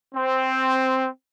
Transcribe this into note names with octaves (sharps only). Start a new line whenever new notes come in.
C4